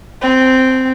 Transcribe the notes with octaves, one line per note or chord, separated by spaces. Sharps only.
C4